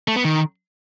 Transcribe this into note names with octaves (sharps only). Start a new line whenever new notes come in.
A3
B3
D#3